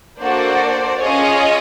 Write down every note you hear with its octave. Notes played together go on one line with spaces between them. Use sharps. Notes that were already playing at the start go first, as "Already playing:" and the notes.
A#3 D4 F#4 A4 C5 D5
C#4 F4 G#4 C#5 D#5